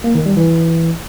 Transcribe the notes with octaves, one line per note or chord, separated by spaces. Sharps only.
A#3
D#3
G3
E3